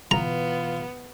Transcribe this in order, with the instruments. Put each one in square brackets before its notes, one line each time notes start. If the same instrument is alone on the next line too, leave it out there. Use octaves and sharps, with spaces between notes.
[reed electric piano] B2 E3 B4 [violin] B3 [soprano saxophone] F4 [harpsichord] A#5